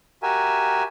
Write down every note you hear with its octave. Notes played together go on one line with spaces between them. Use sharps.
F#4 G4 A#4 E5 G#5